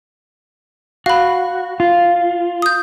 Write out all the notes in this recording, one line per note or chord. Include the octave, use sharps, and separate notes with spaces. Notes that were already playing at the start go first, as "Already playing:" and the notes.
F#4 F5 B5
F4
D#6 G6